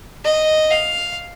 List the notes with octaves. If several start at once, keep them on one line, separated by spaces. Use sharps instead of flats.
D#5
F5